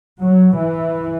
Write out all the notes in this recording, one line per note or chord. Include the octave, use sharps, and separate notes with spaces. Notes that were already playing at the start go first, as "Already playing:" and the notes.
F#3
E3